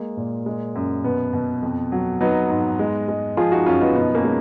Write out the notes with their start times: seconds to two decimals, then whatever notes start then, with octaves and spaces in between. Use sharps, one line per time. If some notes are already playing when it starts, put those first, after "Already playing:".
Already playing: G#3 A#3
0.17 A#2
0.46 G#3
0.75 F#2
1.04 B2 B3
1.33 B2
1.63 F2
1.92 F#3
2.21 F#3 B3 D#4
2.49 G#2
2.79 G#3
3.08 G#3
3.37 F3 F4 G#4
3.52 D#4 F#4
3.66 F#2 C#4 F4
3.81 B3 D#4
3.95 B2 B3 D#4
4.15 A#3 C#4
4.25 G#3